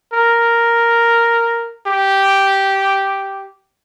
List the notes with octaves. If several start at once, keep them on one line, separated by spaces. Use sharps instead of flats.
A#4
G4